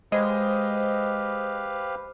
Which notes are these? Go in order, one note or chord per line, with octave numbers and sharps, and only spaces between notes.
G#3 G4 B4 C5 D#5 F5